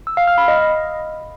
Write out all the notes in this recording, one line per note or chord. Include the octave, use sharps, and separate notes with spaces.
E6
F5
F6
B5
D#5